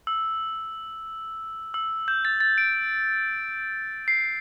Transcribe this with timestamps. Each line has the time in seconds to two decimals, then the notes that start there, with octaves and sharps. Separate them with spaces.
0.07 E6
1.74 E6
2.08 G6
2.25 A6
2.40 A6
2.58 D7
4.08 C7